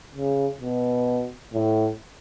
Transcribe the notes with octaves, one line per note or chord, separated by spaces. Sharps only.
C#3
B2
A2